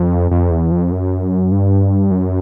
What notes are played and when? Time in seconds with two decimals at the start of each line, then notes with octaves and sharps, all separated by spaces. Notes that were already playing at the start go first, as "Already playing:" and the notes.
Already playing: F2
0.31 F2
0.51 E2
0.71 F2
0.92 F#2
1.52 G2
2.11 F#2